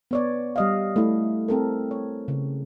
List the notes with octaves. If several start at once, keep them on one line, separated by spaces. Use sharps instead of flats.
B3 C#5 D5
G3 D#5 F5
A3 E4
C4 A4 A#4
C#5
C#3